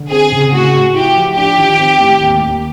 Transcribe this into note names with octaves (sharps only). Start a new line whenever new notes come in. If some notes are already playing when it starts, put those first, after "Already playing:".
Already playing: D3
C4 G#4
C#3
A2 F#4
A2
E4 G4
F3
D4 G4
D#3
C4
A2
D#2
D#2